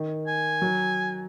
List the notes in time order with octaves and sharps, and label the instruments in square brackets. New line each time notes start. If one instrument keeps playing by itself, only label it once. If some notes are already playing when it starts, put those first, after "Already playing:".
Already playing: [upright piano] D#3
[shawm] G#5
[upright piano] F#3